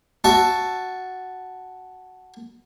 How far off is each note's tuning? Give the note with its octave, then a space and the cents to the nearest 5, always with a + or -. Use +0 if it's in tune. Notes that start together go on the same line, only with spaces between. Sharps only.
F#4 +0 E5 +5 A5 +0